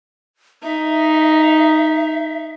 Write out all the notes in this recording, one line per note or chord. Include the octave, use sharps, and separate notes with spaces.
D#4 E5